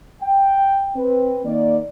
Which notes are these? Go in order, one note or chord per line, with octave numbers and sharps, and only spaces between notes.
G5
C4 B4
D#3 A#3 D5